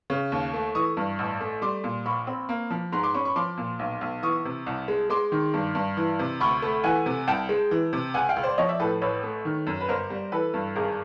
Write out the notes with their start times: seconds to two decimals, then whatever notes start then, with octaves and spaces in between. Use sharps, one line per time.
0.10 C#3
0.32 D#2
0.54 A3
0.75 E3 C#6 D#6
0.97 G2
1.19 A1
1.41 A3
1.62 G3 C6 D6
1.84 A#2
2.05 A#1 B5 C#6
2.27 C4
2.49 A#3
2.70 F3
2.92 G#2 A#5 C6
3.03 C6 D6
3.14 C#4 B5 C#6
3.25 B5 C#6
3.36 F3 C6 D6
3.58 A#2
3.79 B1
4.01 B1
4.23 E3 C#6 D#6
4.45 C3
4.66 C2
4.88 G#3
5.10 G#3 C6 D6
5.32 D#3
5.54 G2
5.75 G2
5.97 E3
6.19 C3
6.40 D2 B5 C#6
6.62 A3
6.84 E3 F#5 G#5
7.06 C3
7.27 C2 G5 A5
7.49 G#3
7.71 E3
7.93 C3
8.14 C#2 F#5 G#5
8.29 F5 G5
8.36 C#2
8.43 C5 D5
8.58 F3 C#5 D#5
8.68 D5 E5
8.80 A2 A4 B4
9.01 A1 B4 C#5
9.23 A3
9.45 D#3
9.67 F#2
9.80 B4
9.89 G1 A#4 C5
10.10 G3
10.32 E3 A4 B4
10.54 G2
10.75 G#1 G#4 A#4